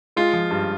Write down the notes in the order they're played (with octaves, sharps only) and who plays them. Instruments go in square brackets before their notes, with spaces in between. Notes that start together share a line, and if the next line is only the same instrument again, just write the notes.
[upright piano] G#3 F4
F3
G2